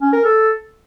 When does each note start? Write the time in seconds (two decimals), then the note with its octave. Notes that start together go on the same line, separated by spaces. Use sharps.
0.01 C#4
0.13 A#4
0.24 A4